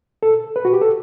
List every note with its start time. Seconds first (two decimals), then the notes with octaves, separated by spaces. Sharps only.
0.23 A4
0.56 B4
0.65 F#4
0.73 G4
0.82 A4